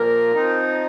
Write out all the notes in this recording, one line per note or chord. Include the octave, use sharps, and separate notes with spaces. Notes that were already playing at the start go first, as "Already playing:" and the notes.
Already playing: A#2 F3 A#3 A#4
F3 C4 D#4